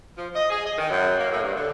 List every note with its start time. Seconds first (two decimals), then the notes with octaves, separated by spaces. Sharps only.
0.17 F3
0.34 D#5
0.50 G#4
0.65 D#5
0.78 D#3
0.90 F#2
1.17 A#3
1.30 A2
1.43 G2
1.55 D3